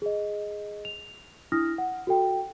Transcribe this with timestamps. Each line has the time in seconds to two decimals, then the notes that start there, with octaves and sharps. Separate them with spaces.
0.02 G#4 D#5
0.85 F7
1.52 D4 E4 D#6 F6 A#6
1.78 F#5
2.07 F#4 A4 G5